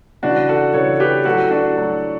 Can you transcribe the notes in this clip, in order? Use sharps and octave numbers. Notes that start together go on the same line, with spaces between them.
C#3 E3 D4 F#4
F#4 A4
C#3 E3 A4 C#5
G4 B4
A2 F#3 F#4 A4
D4 F#4
A2 F#3